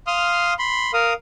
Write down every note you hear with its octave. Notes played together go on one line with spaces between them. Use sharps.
F5 C6 D#6 F6
B5 C6
A#4 F5 D#6